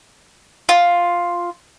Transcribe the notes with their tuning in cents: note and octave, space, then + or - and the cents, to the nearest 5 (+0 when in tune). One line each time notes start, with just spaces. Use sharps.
F4 +0